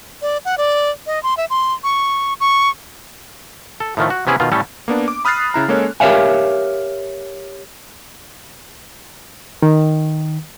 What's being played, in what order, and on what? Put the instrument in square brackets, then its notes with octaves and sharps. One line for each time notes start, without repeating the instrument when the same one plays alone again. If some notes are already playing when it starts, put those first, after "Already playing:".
[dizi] D5
F#5
D5
D#5
C6
E5
C6
C#6
C#6
[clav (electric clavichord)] A4
A2 D#3 F3 A3
F#4
C3 B3 C#4 E4 G#4 B4
B2 D#3 F4
A2 G3 A3 C#4 A4
[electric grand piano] A#3 B3 D4
D6
B5 D#6 F6 F#6 A6 C7
C#3 E4 A#5
G#3 A#3 C#4 A4 C#5
[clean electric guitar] G4 A#4 C#5 E5 F5 G#5
[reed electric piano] D#3